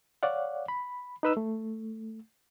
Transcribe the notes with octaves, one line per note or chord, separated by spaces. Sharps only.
C#5 D5 F5 F#5
B5
D#4 B4 E6
A3